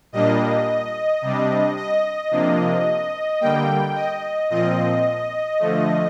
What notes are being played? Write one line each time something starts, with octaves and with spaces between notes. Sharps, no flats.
A#2 G3 A#3 D4 D#5
C3 G3 D4
D#5
C3 F3 A#3 D4
D3 G3 A#3 G5
D#5
A#2 F3 C4 D#5
D3 F3 A3